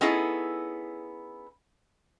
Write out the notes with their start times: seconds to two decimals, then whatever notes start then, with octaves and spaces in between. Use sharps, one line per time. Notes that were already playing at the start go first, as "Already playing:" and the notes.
0.01 B3 C#4 D#4 E4 G#4 A4